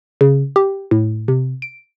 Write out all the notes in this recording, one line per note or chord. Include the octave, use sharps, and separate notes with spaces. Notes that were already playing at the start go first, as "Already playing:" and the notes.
C#3
G4
A2
C3
D7